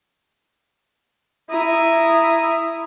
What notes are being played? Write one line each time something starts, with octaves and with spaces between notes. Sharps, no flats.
E4 A#5 D#6